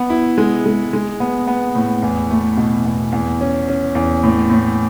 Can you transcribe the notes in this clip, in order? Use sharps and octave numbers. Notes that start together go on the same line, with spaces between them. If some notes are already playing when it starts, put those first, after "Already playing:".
Already playing: B3
E4
G#3
G#3
G#3
B3
B3
A2
E2
A3
B2
E2
E2
C#4
C#4
E2
A2
A2